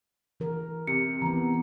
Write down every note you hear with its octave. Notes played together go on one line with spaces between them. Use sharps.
E3 A#4
C3 C#7
E3 B3 A#5